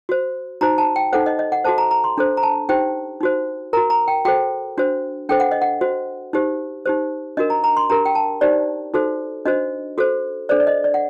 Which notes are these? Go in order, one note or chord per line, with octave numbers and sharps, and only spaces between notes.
F#4 C5
D#4 F#4 C5 A#5
A5
G5
D#4 A4 C5 F#5
D#5
D#5
F#5
F#4 A4 C5 A5
A#5
A#5
C6
D4 A4 C5
A#5
A5
D#4 G4 C5 G5
D#4 F#4 C5
F#4 A#4 A#5
A#5
G5
F#4 A4 C5 G5
D4 F#4 C5
D4 A4 C5 G5
F#5
D#5
F#5
F#4 C5
D#4 G4 C5
D#4 G4 C5
D4 F#4 A#4 D#5
A#5
A#5
C6
D4 G4 A#4 A#5
G5
A5
D#4 G4 C5 D5
D#4 F#4 A4 C5
D4 F#4 C5 D#5
F#4 A4 C5
D4 A4 C5 D5
D5
D#5
D5
F#5